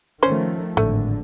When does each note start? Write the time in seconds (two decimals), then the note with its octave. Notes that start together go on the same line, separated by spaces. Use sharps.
0.23 D#3 F3 A3 C#4 C5
0.77 G#1 A2 D3 A3